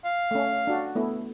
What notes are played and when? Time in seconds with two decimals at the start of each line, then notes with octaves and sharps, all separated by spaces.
0.05 F5
0.31 A3 C#4
0.67 D4 F#4
0.95 A3 B3 E4